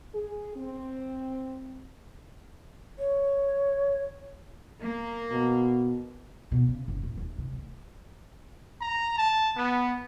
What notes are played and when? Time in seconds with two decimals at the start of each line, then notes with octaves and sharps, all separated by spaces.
0.15 G#4
0.56 C4
2.99 C#5
4.82 A#3
5.31 B2
6.52 B2
6.68 C#3
6.88 F#1
7.03 D#1
7.17 D#2
7.38 C3
7.53 D2
8.81 A#5
9.17 A5
9.56 B3